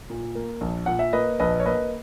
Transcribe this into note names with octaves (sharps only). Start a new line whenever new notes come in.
A#2
A#3
A#1
A#2 F#5
E5
A#3 B4 D#5
A#1 B4 D#5
C#5
A#3 B4 D#5